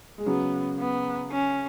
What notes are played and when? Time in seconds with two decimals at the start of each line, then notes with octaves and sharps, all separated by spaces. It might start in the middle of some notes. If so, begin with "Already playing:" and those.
0.18 G#3
0.26 C#3 F#3 B3
0.79 B3
1.31 C#4